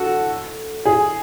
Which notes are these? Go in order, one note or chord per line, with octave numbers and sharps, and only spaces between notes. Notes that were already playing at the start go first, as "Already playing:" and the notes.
Already playing: F#4 A4
G#4